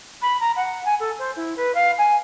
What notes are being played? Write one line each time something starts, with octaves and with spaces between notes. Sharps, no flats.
B5
A#5
F#5
G#5
A4
C5
E4
B4
F5
G#5